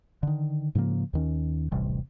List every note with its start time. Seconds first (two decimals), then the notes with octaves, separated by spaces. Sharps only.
0.23 D3 D#3
0.75 G#2 C#3 F3 A#3
1.13 D#2 D#3 C#4
1.71 D#1 A1 C3 G3